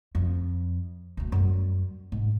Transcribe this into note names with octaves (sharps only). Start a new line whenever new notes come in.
F2
D2 A3
F#2 G3
G#2